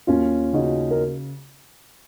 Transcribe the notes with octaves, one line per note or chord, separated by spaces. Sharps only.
D#2 C#4 F4
C#3 D#4 F#4
A#4